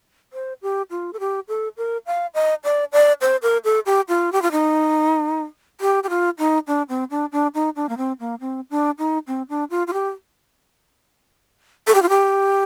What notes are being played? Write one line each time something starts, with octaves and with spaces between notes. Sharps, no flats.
C5
G4
F4
A4
G4
A4
A#4
F5
D#5
D5
D5
C5
A#4
A4
G4
F4
G4
F4
D#4
G4
G4
F4
D#4
D4
C4
D4
D4
D#4
D4
A#3
C4
A#3
C4
D4
D#4
C4
D4
F4
F4
G4
A4
G4
F4
G4